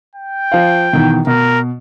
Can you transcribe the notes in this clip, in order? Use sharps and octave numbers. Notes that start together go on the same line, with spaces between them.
G5
F3 F5
B2 D#3 E3
B2 A#4